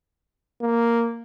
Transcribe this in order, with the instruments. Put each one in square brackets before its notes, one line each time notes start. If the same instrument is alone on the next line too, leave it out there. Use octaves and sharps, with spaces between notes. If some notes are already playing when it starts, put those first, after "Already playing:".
[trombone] A#3